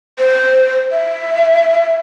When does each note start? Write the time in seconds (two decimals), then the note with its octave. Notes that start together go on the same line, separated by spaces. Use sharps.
0.19 C5
0.92 E5